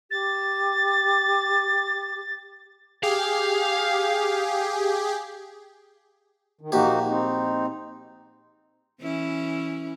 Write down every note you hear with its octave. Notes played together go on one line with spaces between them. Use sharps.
G4 A6
G4 G#4 F5
D#3
A#1 A#3 D#4 F#4 G4
C4 D#4
E3 C#4 E4